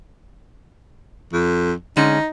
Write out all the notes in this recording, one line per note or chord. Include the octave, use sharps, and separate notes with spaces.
F2
D3 G#3 C#4 D#4